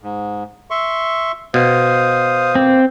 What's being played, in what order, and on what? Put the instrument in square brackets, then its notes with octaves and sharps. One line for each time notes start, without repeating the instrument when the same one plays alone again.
[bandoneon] G#2
E5 C6 C#6
[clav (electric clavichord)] B2 [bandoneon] C5 F5 D#6
[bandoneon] A#3 [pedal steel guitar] C4